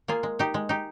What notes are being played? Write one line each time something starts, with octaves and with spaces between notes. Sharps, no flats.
A#3 F4 G#4
G#3
D#4 G4
G#3
D#4 G4